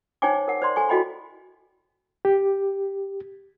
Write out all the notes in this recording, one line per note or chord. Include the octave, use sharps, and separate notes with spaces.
D#4 C5 C#5 G5 G#5 D6
A#4 F#5
C5 D5 C6
A4 G#5 C#6
E4 F#4 A4 D#5 G5 B5
G4